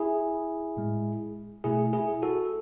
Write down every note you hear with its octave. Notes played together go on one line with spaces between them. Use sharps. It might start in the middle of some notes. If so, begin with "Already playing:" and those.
Already playing: E4 G#4
A2 G#3
B2 A3 E4 G#4
E4 G#4
F#4 A4